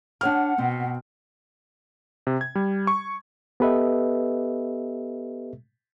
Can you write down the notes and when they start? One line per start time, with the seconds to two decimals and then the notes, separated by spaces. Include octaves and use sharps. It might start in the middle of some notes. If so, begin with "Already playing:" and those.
0.21 D4 C#5 F#5 G5 F6
0.58 B2 C4
2.27 C3
2.41 G#6
2.55 G3
2.87 C#6
3.60 B3 G4 A4 B4 D#5 E5